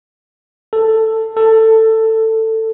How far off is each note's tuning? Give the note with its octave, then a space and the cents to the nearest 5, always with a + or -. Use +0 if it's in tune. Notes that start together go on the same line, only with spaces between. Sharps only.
A4 +10
A4 +15